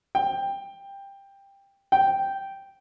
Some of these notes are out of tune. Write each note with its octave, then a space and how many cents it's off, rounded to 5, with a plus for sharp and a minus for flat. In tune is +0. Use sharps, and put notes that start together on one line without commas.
G5 +15
G5 -5